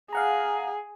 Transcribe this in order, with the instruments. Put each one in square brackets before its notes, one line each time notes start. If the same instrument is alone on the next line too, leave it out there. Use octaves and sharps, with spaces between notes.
[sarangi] G#4 [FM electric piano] F5 F#5 A#5